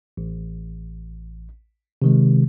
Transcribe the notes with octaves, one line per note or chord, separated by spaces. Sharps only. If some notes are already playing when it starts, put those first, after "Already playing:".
A1
C3 D#3 G#3